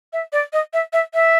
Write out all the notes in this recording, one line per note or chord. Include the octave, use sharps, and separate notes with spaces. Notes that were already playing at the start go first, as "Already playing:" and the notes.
E5
D5
D#5
E5
E5
E5